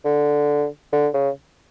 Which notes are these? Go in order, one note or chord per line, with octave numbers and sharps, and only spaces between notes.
D3
D3
C#3